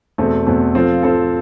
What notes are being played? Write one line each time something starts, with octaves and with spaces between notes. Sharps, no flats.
E2 B2 A3 C4
E2 B2 A3 C4
F3 C4 F4 A4
F3 C4 F4 A4